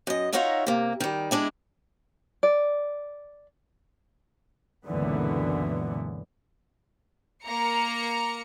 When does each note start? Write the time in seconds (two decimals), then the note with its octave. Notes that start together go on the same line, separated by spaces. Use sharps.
0.07 F#2 D#5
0.33 D#4 F4 F#4 A#4 C#5 E5
0.67 C3 A#3
1.00 D#3 G3
1.31 G#3 D4 E4
2.43 D5
4.85 C#2 F#2 A#2 D3 E3 B3
7.44 A#3 A#5 C#7